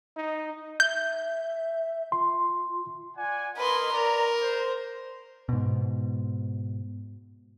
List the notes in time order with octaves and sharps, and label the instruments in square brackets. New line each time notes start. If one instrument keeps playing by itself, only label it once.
[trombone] D#4
[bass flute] E5 [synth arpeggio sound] G6
[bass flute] F4 [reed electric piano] C6
[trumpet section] D5 F#5 G#5
[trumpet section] A#4 D#5 [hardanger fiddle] B4 C6
[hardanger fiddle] A#4 [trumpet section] D5 A#5
[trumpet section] C5
[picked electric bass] G#2 B2